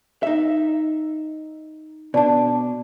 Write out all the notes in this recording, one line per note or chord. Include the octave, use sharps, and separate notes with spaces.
D#4 E5
B2 D4 D5 A5